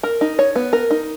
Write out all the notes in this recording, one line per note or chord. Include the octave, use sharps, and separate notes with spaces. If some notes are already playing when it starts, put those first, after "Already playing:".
A#4
D#4
C#5
B3
A#4
D#4